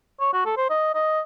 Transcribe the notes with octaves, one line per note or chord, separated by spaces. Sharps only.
C#5
F#4
A4
C5
D#5
D#5